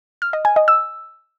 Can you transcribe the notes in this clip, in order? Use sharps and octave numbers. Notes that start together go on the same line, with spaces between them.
F6
D#5
G#5
D#5
E6